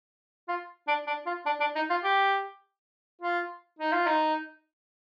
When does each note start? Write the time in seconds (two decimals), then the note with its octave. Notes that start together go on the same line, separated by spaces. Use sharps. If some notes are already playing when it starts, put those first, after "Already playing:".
0.48 F4
0.87 D4
1.07 D4
1.26 F4
1.46 D4
1.60 D4
1.75 D#4
1.90 F4
2.04 G4
3.21 F4
3.79 D#4
3.92 F4
4.06 D#4